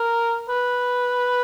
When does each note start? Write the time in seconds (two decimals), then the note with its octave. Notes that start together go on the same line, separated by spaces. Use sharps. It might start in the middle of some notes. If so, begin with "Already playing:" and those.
Already playing: A#4
0.49 B4